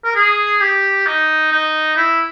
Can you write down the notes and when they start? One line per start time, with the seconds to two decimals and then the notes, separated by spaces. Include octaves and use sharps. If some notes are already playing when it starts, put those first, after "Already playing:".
0.04 A#4
0.15 G#4
0.61 G4
1.06 D#4
1.52 D#4
1.97 E4